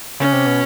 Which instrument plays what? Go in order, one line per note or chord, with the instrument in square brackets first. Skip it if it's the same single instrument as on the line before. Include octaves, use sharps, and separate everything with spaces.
[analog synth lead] C#3 [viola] C#4
[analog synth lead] C3
B2